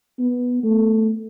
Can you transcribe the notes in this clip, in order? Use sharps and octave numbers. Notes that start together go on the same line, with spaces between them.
B3
A3